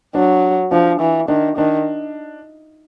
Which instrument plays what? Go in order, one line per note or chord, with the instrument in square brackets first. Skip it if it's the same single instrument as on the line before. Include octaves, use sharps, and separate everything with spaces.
[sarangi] F#3 [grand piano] D4
[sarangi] F3 [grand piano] D4
[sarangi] E3
[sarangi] D#3 [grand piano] D4
[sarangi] D#3 [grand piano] D4